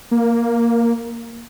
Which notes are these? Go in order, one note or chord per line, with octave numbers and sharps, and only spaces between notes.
A#3